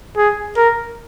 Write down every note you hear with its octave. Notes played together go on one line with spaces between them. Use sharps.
G#4
A#4